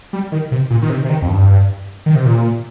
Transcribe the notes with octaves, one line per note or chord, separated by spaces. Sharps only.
G3
D#3
C3
A#2
D#3
C3
C3
D#3
F2
G2
D#3
C3
A#2